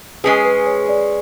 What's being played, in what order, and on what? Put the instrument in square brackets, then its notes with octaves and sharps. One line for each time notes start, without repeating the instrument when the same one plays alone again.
[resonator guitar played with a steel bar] G#3 C#4 G#4 [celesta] B4
[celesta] B4
C#5
D5